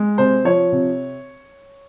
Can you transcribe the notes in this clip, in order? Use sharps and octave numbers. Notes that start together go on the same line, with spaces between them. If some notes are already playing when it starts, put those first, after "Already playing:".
Already playing: G#3
C3 C5
F3 C#5
C3